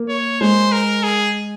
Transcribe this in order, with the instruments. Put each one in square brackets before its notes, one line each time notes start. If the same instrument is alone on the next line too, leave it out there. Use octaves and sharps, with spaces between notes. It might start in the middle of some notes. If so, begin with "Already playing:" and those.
Already playing: [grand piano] A#3
[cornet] C#5
[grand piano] G#3 [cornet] C5
[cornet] A#4
G#4